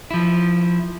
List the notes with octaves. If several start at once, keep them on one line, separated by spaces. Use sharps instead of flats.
F3 E4